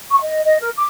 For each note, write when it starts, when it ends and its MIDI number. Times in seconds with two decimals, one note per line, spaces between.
0.10 0.18 85
0.21 0.42 75
0.45 0.56 75
0.60 0.70 70
0.76 0.85 86